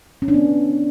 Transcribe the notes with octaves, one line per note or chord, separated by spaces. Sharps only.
C#4
D4
B3